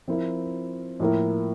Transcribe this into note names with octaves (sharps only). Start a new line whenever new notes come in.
F3 C4 E4 A#4
A2 F3 A#3 E4 A#4